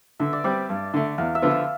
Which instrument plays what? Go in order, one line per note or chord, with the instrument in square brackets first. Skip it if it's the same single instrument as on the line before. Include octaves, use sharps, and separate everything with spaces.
[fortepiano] D3 [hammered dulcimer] E5
[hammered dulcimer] D5
[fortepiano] G3 C4 [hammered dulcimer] D5
[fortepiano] G2
D3 A3
[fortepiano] E2 [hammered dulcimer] F5
[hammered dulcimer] E5
[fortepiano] D3 F3 B3 F4
[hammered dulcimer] F5